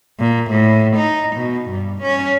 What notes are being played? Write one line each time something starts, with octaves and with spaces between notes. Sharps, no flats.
A#2
A2
D#4
B2
G2
C#4